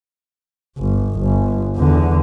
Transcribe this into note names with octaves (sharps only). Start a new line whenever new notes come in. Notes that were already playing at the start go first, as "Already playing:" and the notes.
G1
G1
E2 D3